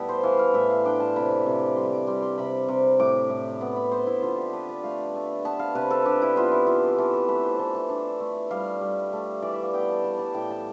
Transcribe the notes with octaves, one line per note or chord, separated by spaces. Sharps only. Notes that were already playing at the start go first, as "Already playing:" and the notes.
Already playing: A2 G3 B3 G4 A4
C5
E3 F5
F5
A2 E5
F5
D4 G5
A5
C3 B5
C3
G3 C6
D6
G3 C6
C6
C3 B5
C3
A2 D6
A2
B3
B5
B3 C5
E4
D3 F4
G4
D4 B4
D5
A3 F5
A3
B3 A5
F5
C3 B4
A4
D4 G4
E4
B3 F4
E4
E3 F4
E3 A4
A4
A3 B4
C5
E3 A5
A5
D4
A3
G3 F5
G3
A3
E3 D5
E5
F5
B3 G5
A5
G3 A5
A5
A2 G5
A5